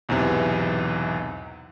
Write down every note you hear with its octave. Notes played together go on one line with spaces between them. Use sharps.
B1 E2 G#2 C3 E3